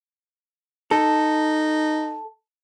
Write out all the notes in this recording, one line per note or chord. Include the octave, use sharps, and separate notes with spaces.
D#4 A4